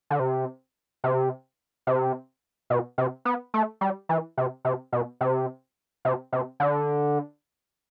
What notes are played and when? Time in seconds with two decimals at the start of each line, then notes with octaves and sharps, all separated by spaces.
0.10 D3
0.20 C3
1.04 C3
1.87 C3
2.70 B2
2.98 C3
3.25 B3
3.54 A3
3.81 G3
4.09 E3
4.37 C3
4.65 C3
4.93 B2
5.21 C3
6.05 C3
6.33 C3
6.60 D3